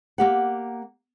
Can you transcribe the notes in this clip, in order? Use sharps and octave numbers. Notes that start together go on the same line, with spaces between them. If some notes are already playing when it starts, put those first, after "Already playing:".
A#3 G4 F#5